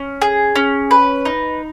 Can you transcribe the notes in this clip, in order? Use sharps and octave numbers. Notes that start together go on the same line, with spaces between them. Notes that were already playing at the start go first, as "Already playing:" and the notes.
Already playing: C#4
G#4
C#4
B4
D#4